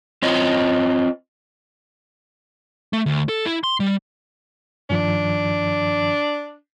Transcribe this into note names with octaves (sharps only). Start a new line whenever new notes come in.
C4 F4 C5 C#5 D#5
A3
D2
A4
E4
C6
G3
G2 D#3 F3 D4